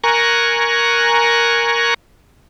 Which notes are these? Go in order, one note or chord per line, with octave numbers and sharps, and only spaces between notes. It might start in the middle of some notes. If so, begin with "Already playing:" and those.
A#4 G#5 A#5 C#6 F#6